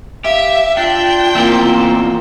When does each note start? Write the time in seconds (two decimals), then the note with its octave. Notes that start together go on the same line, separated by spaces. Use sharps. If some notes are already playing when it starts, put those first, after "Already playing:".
0.24 G4 E5 F5
0.77 D4 F4 G5
1.35 E2 A#3 C4 E5